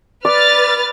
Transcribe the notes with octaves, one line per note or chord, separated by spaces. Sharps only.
B4 D5 F6 A6